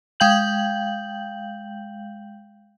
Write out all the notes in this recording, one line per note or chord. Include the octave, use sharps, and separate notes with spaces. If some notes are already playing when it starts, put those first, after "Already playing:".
G#3 F5 G5 G6 F#7